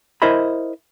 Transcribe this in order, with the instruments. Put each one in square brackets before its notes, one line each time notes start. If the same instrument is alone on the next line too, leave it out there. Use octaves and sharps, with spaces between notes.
[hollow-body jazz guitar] E4 A#4 C5 D#5 E5 B5